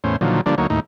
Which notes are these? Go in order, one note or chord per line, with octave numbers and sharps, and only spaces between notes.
E2 A2 C#4 C5
A#2 D3 D#3 F3 F#3
D3 F3 G3 A#3 D4
D2 F#3 A#3 D#4 C#5
D#2 A2 D#4